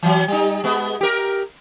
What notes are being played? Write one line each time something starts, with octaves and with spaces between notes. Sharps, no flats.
E3 F#3
G3 D#4
G#3 B3
G4 A#4